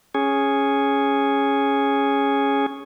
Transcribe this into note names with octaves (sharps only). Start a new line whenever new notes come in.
C#4 G#4